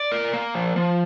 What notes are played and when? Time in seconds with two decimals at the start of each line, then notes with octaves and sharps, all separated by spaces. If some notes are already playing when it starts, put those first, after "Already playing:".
Already playing: D5
0.12 A#4
0.33 A#3
0.55 F3
0.76 F3